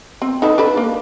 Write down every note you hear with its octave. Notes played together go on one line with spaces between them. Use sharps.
C4
D#4 A4 B4
D4 A4 B4
A#3